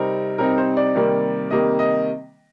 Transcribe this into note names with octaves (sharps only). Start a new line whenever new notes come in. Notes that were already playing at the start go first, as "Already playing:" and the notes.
Already playing: C3 G3 C4 D#4 A#4
C3 G3 C4 D#4 A#4
C5
D5
C3 D#3 G3 A#3
C3 D#3 G3 A#3 D#5
D#5